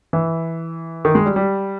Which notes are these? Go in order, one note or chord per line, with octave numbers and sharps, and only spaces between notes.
E3
D#3
G#3
G3
G3